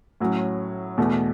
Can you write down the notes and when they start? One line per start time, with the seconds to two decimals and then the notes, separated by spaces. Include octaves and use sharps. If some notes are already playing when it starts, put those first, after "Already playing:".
0.20 A2 F#3 C#4
0.98 E2 B2 A3